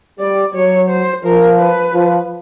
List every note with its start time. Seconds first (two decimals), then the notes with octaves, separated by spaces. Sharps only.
0.19 G3 D5
0.54 F#3 C#5
0.89 C5
1.24 F3 A#4
1.60 B4
1.94 F3